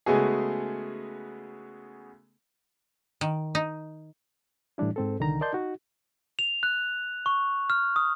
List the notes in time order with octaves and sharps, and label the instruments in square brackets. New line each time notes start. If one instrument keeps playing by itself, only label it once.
[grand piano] C#3 G#3 A3 B3 F#4 G#4
[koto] D#3
D#4
[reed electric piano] A2 E3 G3 D4 E4
G#2 C4 A4
C2 D3 D#3 D#4 A#5
A#4 D5 D#5 A5 C6 G6
D#4 F#4
[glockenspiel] F7
F#6
C#6
F6
D#6